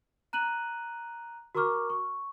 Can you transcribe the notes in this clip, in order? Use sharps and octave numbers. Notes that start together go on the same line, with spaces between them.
A#5 F#6 D#7 F#7
F#4 A#4 A#5 C#6 D6 F6
C#6